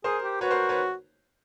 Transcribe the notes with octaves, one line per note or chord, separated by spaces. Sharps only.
G#4 A#4 C5
G4
F#4 B4 C#5
A#4 C5
B4 C#5